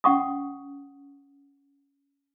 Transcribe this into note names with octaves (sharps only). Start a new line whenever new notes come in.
C#4 F#5 C#6 D#6